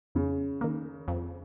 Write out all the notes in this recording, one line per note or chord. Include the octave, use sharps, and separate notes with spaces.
F2 C#3
D#3 A#3
F2